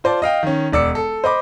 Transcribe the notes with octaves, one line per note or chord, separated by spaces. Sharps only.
F4 C5 D5 A5
D#5 F5 G5
D#3 C#4
E1 D5 E6 C#7
A4
C5 D#5 B5 D6